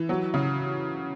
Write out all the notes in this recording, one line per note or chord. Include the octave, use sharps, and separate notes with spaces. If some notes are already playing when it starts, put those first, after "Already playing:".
Already playing: E3
F#3
C#3